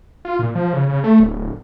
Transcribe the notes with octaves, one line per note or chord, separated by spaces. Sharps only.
F4
A#2
F3
C#3
C#3
A3
D1